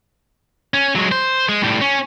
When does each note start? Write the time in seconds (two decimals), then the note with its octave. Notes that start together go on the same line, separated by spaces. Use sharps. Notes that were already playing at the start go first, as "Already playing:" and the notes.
0.74 C#4
0.95 F#3 G#3
1.12 C5
1.49 G#3
1.62 A2 G3
1.81 C#4